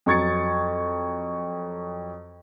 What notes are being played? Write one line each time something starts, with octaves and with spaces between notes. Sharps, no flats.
F2 F#3 C#6 G#6 A6 C#7